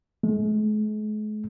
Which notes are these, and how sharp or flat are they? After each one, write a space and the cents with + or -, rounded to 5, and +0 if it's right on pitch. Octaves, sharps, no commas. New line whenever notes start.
G#3 +45